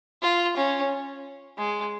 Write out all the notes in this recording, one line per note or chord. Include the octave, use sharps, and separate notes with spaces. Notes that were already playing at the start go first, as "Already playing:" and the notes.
F4
C#4
G#3